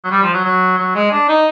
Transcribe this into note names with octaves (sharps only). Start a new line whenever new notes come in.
F#3
G3
F3
F#3
F#3
F#3
G#3
D4
D#4